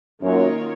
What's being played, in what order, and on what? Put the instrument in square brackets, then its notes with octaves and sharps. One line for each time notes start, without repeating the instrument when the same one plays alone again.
[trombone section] F#2 [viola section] D#3 A#3 F4 A#4 C#5